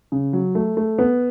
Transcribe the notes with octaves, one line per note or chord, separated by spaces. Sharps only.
C#3
F#3
A3
A3
B3